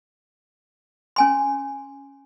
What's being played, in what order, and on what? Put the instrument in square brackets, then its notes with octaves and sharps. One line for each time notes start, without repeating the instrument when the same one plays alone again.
[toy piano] C#4 G#5 C6